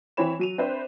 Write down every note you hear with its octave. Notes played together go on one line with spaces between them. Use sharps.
E3 C4 E4 C#5 B5 E7
F#3 D#7 F7
C4 D4 B4 C5 E5